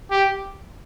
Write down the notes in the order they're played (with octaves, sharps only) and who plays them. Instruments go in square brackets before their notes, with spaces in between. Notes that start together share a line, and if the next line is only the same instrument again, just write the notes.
[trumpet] G4